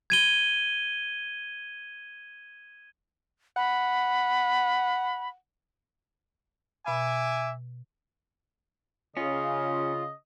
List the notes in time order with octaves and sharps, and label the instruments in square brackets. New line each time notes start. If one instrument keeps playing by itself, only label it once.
[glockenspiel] G#6 D#7 G7
[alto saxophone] F#5 [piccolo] B5
[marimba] B2 B5 [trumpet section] E5 G#5 D6
[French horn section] C#3 [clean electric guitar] C#4 [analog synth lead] F4 [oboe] D#5